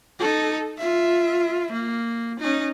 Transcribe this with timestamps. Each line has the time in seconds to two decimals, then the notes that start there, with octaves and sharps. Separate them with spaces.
0.19 D#4 A4
0.78 F4 E5
1.72 A#3
2.40 C#4 D#4